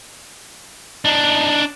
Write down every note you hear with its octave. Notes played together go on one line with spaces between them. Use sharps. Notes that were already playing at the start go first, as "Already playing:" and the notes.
D4 D#4